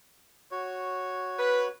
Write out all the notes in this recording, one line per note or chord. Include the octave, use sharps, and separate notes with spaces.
F#4 C#5
B4